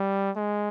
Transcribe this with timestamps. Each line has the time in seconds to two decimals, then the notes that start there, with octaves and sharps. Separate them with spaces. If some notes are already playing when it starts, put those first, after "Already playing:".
Already playing: G3
0.36 G#3